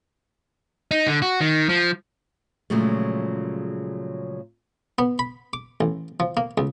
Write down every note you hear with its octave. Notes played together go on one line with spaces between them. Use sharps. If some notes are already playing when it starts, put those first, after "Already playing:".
D#4
D3
F#4
D#3
F3
A#2 C#3 F3 F#3 G#3 A3
B3
B5
D6
A1
F3
A#3
C#2